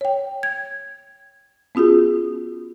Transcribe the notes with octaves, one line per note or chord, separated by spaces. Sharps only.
C#5 G5
G#6
B3 C#4 F4 F#4 G#4